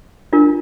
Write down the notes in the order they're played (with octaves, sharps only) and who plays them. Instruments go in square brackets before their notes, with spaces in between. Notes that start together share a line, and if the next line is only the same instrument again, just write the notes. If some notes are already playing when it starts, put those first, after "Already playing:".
[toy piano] D4 F4 A#4